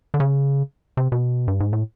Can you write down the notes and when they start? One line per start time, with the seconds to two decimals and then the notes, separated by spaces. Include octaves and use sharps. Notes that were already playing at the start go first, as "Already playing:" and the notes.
0.14 D3
0.20 C#3
0.97 C3
1.12 B2
1.48 G2
1.60 G#2
1.73 A2